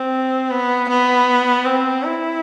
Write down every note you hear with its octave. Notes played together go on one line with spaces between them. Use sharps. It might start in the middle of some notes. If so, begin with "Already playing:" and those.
Already playing: C4
B3
B3
C4
E4